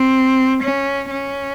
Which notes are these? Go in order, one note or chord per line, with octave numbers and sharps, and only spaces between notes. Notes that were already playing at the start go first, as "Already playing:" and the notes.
Already playing: C4
C#4
C#4